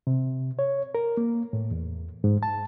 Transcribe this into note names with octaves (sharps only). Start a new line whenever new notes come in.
C3
C#5
A#4
A#3
A2
E2
G#2
A5